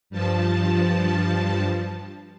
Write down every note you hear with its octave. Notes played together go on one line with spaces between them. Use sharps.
G2 F3 A5